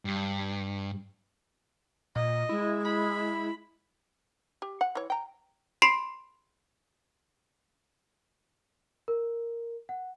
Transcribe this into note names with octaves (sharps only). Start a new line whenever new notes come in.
G2
A#2 D#5
G#3 E4
B5
G4
F#5
E3 C#5
G5 A#5
B5 C6 C7 D7
A#4
F#5